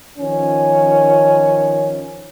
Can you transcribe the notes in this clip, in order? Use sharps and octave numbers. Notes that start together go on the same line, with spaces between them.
D#3 F3 C#4